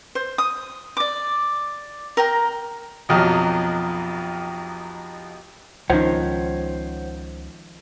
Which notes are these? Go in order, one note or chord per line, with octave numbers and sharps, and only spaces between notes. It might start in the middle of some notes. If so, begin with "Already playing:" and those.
C5
D#6
D5 D6
A#4 G5 A#5
B1 F2 F#3 G4 A#4 D#5
C#2 D#3 F3 C#4 C5 C#5 F#5